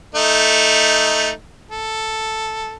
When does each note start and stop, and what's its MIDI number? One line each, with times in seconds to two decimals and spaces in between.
0.15 1.30 57
0.15 1.30 63
1.71 2.75 69